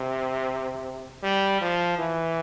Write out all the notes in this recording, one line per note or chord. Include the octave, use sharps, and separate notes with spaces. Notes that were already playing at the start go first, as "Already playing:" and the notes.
Already playing: C3
G3
F3
E3